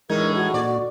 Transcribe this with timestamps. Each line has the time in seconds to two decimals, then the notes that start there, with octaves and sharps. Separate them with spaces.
0.10 A2 E3 G#3 D#4 A#4 G#6
0.36 F#4
0.54 A#2 D5